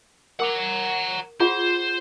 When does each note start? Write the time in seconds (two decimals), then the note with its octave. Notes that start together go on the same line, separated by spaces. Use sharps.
0.40 A#4 F#5 A#5 D6
1.40 F4 G#4 C5 F#5